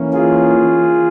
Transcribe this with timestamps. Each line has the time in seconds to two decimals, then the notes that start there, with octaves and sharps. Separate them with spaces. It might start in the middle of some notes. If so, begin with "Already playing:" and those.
Already playing: E3 A#3 C#4
0.13 F4 G#4